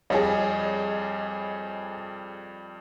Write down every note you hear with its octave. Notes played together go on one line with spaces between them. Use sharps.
F2 G3 G#4 C#5 D#5